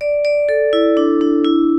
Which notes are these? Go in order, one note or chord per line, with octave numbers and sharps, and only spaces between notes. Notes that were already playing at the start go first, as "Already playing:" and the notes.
D5
D5
A4
E4
D4
D4
E4